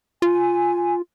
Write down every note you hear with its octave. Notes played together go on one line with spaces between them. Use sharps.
F4 G#5